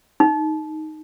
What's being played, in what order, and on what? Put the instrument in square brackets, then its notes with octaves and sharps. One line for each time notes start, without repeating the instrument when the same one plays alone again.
[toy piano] D#4